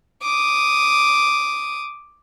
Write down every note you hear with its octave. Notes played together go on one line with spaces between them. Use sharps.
D6 D#6